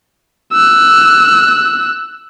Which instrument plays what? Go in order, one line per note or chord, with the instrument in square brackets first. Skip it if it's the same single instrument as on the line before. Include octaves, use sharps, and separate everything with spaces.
[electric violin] E6 F#6